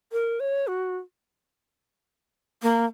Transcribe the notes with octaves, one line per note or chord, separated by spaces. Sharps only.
A#4
C#5
F#4
A#3